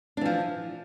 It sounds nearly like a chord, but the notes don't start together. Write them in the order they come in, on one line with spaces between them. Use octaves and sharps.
D4 E3 F3